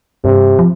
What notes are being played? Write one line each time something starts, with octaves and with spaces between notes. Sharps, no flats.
G2 C3
F3